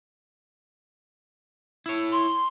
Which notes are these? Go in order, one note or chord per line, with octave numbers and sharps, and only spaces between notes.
E4 C#5
C6